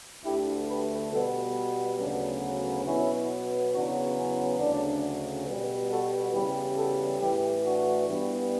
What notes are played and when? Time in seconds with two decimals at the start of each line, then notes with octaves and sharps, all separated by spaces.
0.24 D2 D3 A3 E4 G4
0.67 G4 B4
1.11 B2 G3 B3 F#4 A4
1.98 D2 C#3 F#3 B3 D4
2.85 B2 F#3 B3 C#4 E4
3.72 E2 C#3 F#3 B3 D4 F#4
4.16 C#4
4.59 D2 C#3 F#3 D4
5.46 B2 G3 B3
5.89 F#4 A4
6.33 E2 C#3 G3 G4 B4
6.76 F#4 A4
7.20 A2 E3 A3 E4 G4
7.63 D4 F#4
8.08 G2 E3 G3 B3